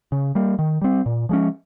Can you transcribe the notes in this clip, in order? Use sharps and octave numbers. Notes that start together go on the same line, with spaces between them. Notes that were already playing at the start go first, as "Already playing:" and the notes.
C#3
G3 A#3
D#3
G3 C4
A#2
F3 G#3 C#4